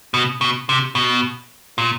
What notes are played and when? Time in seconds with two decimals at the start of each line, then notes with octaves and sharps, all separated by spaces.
0.14 B2
0.41 B2
0.69 C3
0.95 B2
1.78 A#2